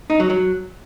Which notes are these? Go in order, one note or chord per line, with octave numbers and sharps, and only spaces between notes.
D#4
F#3
F#3